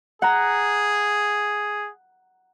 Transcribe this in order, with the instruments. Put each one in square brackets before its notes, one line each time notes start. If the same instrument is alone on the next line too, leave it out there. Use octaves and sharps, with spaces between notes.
[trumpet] G#4 [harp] F#5 A#5